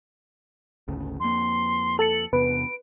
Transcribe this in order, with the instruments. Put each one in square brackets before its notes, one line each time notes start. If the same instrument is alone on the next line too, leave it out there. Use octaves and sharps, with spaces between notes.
[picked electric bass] G#1 D2 C#3
[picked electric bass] F2 A#3 [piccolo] C6
[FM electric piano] A4 A5 C#7 [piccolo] F#7
[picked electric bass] E2 C3 B3 [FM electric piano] B4 [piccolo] D7